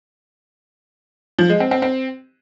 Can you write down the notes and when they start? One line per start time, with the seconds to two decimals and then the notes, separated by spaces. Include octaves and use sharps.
1.39 F3
1.49 G#3
1.60 C4
1.71 C4
1.82 C4